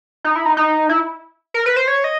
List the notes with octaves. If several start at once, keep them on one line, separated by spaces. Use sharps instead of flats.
D#4
E4
D#4
D#4
E4
A#4
B4
C5
C#5
D#5